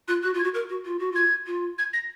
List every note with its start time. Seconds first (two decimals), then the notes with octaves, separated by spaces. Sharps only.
0.08 F4 F#6
0.23 F#4 F#6
0.34 F4
0.39 G#6
0.44 F#4
0.54 A#4
0.69 F#4
0.85 F4
0.99 F#4
1.12 F4 G#6
1.47 F4
1.78 G#6
1.93 A#6